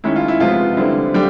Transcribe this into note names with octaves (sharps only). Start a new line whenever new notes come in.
D#3 G#3 C#4 E4
F4
E4
C3 F3 G#3 B3 F4
D3 G3 C4 E4
D3 G3 G4